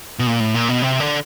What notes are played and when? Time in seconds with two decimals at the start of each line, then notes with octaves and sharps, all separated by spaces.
0.19 B2
0.27 A#2
0.40 A2
0.54 A#2
0.69 B2
0.82 C3
1.00 D3